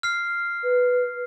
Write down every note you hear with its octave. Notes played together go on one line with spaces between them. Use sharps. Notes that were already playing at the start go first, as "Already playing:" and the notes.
F6 C7
B4